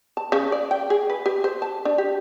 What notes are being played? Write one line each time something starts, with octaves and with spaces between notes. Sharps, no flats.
A5
C#3
D5
G5
G#4
B4
G4
C5
A5
D4
G4